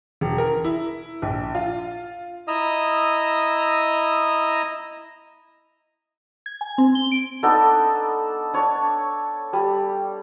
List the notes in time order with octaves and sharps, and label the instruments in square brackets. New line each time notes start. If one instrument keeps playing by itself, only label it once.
[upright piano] E1
A#4
E4
A#1
F4
[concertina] E4 D#5 A#5 D#6 E6
[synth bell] G#6
G#5
C4
G7
D7
[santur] B3 D4 D#4 A4
D4 C#5
G3